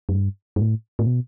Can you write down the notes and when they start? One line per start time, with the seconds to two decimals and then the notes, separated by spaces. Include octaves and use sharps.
0.09 F#2
0.15 G2
0.56 G2
0.61 A2
0.99 A2
1.06 B2